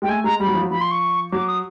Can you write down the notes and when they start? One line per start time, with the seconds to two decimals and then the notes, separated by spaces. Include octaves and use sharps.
0.02 G#3 G5
0.08 A3 G#5
0.24 G#3 A#5
0.40 G3 B5
0.47 F#3
0.54 F3
0.61 F#3
0.70 F3 B5
0.81 C6
0.91 C#6
1.32 F#3 D6
1.47 D#6